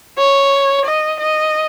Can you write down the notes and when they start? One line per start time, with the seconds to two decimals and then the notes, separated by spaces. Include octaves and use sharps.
0.18 C#5
0.85 D#5
1.20 D#5